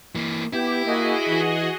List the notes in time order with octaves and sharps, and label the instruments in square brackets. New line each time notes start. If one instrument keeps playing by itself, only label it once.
[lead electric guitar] E3 A#3
[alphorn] B3 [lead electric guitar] E4 [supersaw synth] G4
[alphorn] A#3 [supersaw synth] F#4 G#4 D#5
[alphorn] E3